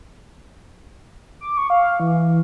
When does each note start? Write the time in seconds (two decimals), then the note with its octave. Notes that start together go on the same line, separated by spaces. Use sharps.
1.41 D6
1.57 C#6
1.70 F5
2.00 E3